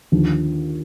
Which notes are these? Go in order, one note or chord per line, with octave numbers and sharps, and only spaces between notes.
D#2 D3 F3